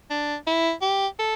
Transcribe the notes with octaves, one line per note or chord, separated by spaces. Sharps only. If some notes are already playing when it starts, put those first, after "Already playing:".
D4
E4
G4
A4